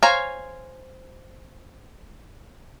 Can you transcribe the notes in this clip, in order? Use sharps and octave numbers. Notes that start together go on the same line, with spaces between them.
C5 C#5 F5 G#5 A#5